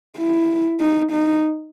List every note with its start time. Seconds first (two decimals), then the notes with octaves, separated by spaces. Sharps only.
0.18 E4
0.80 D#4
1.12 D#4